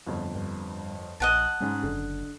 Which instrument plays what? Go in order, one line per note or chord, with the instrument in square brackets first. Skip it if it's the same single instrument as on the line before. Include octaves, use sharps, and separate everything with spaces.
[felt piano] G1 F2
[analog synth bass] G2
[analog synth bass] A#1 [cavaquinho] D#5 F#5 A5
[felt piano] G#2 C#4 [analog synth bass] G#3
[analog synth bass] F#1 [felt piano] D3